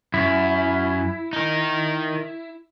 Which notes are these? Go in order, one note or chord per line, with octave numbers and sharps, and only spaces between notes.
F#2 E4
D#4 A#4